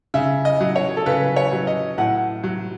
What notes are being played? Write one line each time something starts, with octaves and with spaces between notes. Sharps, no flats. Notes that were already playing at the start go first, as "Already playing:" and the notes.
C#3 E5
D#5
F#3
C#5
A4
C#3 B4
C#5
F#3
D#5
A2 F#5
F#3